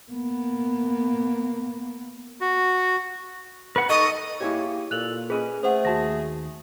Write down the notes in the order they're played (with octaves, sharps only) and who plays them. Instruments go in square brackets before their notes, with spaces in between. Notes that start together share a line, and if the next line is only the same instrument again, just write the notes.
[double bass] A#3 B3
[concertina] F#4
[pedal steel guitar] B4 F#5
[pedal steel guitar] D#4 A4 C#6 [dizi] D#5
[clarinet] A#3 [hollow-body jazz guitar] E4 G#4 C#5 [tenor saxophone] G4
[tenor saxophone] A#2 [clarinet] A4 [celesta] F#6 F7 F#7
[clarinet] C#4 [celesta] G#4 [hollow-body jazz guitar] B4 D#5
[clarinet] A3 [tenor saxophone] G#4 [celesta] C5 F#5
[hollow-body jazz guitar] D#2 A5 [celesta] F#4 A#6